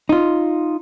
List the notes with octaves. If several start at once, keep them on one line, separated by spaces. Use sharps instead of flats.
D#4 F4